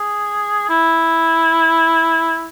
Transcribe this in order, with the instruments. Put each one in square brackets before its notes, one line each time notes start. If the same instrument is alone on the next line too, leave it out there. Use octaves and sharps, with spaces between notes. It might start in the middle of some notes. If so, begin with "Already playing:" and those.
Already playing: [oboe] G#4
E4